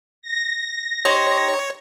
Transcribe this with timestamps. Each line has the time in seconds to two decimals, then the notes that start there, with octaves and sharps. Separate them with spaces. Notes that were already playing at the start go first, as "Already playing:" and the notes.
0.22 A#6
1.05 D#4 G4 C5 C#5